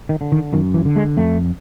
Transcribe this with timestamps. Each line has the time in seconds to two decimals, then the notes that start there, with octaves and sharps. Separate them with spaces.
0.09 D#3
0.21 D3
0.32 D#3
0.53 F#2 D#3
0.74 E3
0.85 D3
0.96 G#3
1.17 F2 A3